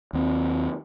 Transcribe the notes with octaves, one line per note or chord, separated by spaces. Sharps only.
D#2 C4